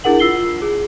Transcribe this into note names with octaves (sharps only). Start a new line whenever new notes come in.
D4 E4 G#4 A#4 F#5 F#7
F4 E6 C7 G7
G#4